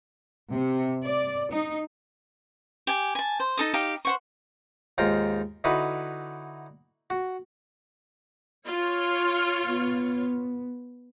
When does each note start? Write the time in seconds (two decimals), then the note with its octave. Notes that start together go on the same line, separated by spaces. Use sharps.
0.53 C3
1.05 D5
1.51 D#4
2.87 G4 G#5
3.15 G#5 A5
3.40 C5
3.57 D#4 A4 D#6
3.74 D#4 G4 F5
4.05 C5 F#5 C#6
4.98 D#2 G#2 F4 G5 A#5
5.64 D3 D#4 E4 F#4 B4
7.10 F#4
8.66 F4 C#5
9.66 B3